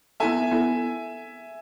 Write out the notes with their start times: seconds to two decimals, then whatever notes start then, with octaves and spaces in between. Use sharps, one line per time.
0.20 B3 E4 A4 E5 G#5
0.51 B3 E4 A4